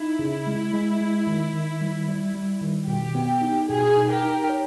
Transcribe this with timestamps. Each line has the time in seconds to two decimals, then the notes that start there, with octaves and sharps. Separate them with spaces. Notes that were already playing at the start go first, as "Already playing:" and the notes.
Already playing: D#4 E4
0.19 C#3
0.47 G#3
0.73 G#3
1.01 G#3
1.27 D#3
1.53 D#3
1.81 G3
2.08 G3
2.35 G3
2.61 D#3
2.88 B2 G4
3.15 B3
3.42 D#4
3.68 B2 G#4
3.95 D#4
4.09 G4 A#4
4.23 D#4
4.49 C#5